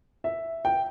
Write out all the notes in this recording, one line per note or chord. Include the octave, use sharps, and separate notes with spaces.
E5
G5